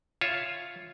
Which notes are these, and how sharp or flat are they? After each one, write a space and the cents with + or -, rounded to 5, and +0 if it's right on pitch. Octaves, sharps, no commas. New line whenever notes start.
F4 +0 C#5 +0 E5 +0